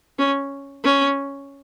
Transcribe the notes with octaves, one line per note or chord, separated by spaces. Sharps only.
C#4
C#4